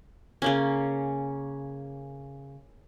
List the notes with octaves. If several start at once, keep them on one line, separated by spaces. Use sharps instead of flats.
C#3 A#3 C#4